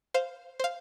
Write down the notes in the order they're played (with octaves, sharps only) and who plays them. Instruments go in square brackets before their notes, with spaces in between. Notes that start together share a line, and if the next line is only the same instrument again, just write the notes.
[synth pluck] C5 F5
C5 F5